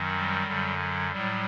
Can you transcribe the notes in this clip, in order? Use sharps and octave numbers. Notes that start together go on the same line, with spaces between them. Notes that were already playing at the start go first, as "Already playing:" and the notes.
Already playing: F#2 D#3 F#3
G3
F#2 D3 F#3
F#3
A2 F#3 G3